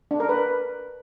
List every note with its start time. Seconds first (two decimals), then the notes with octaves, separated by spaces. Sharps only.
0.11 D4
0.20 A#4
0.29 B4